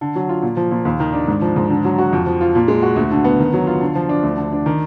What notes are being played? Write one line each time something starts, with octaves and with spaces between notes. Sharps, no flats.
D3
F#3
F4
A#2
F3
A#2
D#2
D#3
D4
G#2
F3
G#2
D3
F#3
F#4
F2
F3
F4
A#2
G#3
F#4
D2
D3
B3
D#3
F#3
F4
D3
F3
D4
D2
D3
D4
D#3